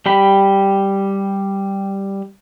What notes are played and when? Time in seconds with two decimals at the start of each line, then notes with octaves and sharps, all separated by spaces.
0.06 G3 G4 B5